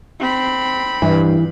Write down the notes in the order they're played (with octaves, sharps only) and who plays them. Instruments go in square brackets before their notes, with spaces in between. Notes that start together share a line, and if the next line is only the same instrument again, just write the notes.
[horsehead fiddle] C4 B5
[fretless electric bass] G2 [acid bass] E3